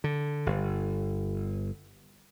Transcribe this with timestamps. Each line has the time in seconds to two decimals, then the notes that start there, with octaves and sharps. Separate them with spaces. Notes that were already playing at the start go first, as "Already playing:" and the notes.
0.04 D3
0.46 G1